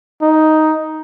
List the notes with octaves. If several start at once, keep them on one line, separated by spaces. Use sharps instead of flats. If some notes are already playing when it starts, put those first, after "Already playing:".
D#4